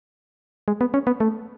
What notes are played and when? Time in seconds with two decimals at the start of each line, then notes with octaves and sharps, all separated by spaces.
0.68 G#3
0.81 B3
0.94 C#4
1.07 B3
1.20 A3